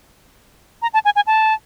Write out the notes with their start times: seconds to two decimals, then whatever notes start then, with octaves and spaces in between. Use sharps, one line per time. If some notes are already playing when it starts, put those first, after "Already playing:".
0.82 A#5
0.94 A5
1.05 G#5
1.16 G#5
1.27 A5